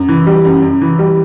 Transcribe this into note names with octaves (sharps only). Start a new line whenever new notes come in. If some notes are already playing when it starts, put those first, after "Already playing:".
Already playing: F#2
E3
G3
F#2
F#2
E3
G3